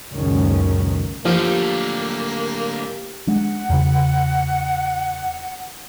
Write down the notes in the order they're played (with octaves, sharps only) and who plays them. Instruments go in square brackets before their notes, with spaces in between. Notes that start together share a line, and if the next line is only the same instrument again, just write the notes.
[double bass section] C#2 F#2 A#2 D#3 C#4
[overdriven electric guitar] A2 D3 [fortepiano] F3 [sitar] G3 [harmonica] A#3
[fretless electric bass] G#3 D4 [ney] F#5
[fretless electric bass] E2 C#3